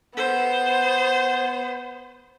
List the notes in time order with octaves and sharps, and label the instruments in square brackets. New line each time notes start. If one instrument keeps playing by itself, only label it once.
[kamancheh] B3 [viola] C5